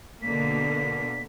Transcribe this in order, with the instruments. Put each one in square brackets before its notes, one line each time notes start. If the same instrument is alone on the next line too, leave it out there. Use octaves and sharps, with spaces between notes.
[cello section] B2 D3 A#3 [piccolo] B6